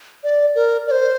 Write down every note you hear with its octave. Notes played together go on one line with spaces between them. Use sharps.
D5
A#4
D5
C5